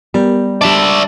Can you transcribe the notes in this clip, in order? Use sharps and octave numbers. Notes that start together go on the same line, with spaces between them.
G3 B3 G4 A#4
G3 D4 D5 E5